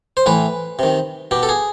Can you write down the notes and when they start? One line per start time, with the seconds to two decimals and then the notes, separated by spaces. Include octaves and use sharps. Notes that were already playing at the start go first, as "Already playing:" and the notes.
0.17 C5
0.26 A2 E3 B4
0.79 C3 D#3
1.31 B2 G4
1.43 A4
1.49 G#4